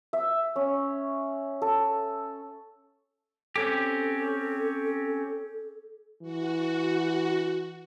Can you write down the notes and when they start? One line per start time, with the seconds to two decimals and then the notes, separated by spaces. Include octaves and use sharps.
0.13 E5
0.56 C#4
1.62 A4
3.56 C4 C#4 G4 A4
6.22 E3 F#4